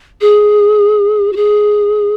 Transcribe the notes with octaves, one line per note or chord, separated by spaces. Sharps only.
G#4
F#4
G#4